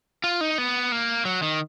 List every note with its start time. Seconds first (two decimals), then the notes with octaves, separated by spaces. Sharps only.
0.24 F4
0.41 D#4
0.58 B3
0.92 A#3
1.25 F#3
1.42 D#3